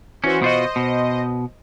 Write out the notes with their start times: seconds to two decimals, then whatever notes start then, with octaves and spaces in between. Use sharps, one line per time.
0.24 E3 C#4 F#4 C5
0.42 B2 F4 F#4 C5 D#5
0.76 B2